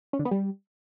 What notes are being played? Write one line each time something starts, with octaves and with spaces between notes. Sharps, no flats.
C#4
D3
B3
G3